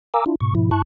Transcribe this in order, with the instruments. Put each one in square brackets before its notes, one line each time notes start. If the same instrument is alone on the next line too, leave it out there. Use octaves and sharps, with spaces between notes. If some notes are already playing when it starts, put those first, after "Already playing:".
[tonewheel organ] A#4 F5 G#5 A#5 D6 E6
D4 E4 F4
G#2 B2 C#6
G#2 B2 F3 E4
G2 E4 A5 C#6 F#6